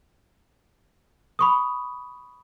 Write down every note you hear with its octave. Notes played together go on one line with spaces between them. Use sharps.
B5 C#6 D#6